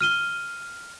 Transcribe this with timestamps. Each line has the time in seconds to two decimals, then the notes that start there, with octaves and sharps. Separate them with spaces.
0.01 F6 D#7 G7